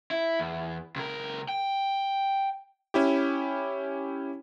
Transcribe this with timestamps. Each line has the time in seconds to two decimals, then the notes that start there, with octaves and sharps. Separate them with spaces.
0.11 E4
0.39 E2
0.96 C#2 A#4
1.49 G5
2.94 C#4 E4 G4